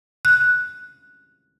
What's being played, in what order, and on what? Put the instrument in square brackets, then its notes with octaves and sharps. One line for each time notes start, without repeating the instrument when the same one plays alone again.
[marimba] F#6